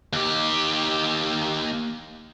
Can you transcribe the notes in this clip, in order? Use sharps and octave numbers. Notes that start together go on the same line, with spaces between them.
D#2 G4